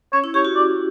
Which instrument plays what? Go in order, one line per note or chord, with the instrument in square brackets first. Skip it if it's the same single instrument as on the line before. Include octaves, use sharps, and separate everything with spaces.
[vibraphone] C#4 [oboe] C#5
[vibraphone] E4
[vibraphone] G4 [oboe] C#5
[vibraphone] F#4
[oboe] D5